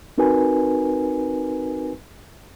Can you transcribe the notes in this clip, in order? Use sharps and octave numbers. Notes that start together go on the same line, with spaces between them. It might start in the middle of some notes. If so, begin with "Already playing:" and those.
C4 D#4 F#4 A#4 B4 G#5